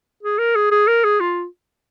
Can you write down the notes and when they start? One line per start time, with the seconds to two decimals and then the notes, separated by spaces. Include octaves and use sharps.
0.23 G#4
0.39 A#4
0.56 G#4
0.71 G#4
0.88 A#4
1.04 G#4
1.20 F4